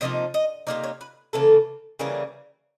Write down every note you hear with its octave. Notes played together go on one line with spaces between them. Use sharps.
C3 F3 A#3 D#4 D#5
D#5
C3 F3 A#3 D#4 D5
C#5
B4
C#3 E3 A#3 A4
C#3 E3 G3 A#3 G#4